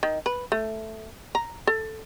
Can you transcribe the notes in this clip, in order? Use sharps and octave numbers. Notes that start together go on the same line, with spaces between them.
D#3
B4
A3
A#5
A4